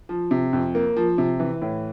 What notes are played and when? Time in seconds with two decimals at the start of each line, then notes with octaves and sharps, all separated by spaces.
0.09 F3
0.31 C3
0.53 F2
0.75 A#3
0.97 F3
1.18 C3
1.39 E3
1.62 A2